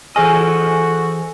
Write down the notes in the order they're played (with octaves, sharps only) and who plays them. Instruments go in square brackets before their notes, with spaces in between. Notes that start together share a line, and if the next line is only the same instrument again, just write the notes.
[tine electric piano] E3 G#4 A#6 [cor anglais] F#4 [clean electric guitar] A4 C5 D#5 [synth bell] G#5